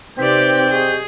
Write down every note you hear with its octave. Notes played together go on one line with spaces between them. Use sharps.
C3 C4 D#4 G4 B4 C5 D5 G6
G4 G#4 D#5 C#6